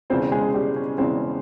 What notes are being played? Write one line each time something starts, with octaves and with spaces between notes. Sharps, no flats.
E1 E2 C#3 E3 C4 C5
G#3 G#4
G3 G4
C#4
E1 E2 C#3 E3 C4